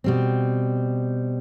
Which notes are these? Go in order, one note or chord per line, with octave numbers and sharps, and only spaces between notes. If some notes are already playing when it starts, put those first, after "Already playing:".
B2 G3 C4